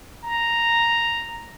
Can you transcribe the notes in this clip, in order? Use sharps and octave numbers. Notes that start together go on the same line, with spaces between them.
A#5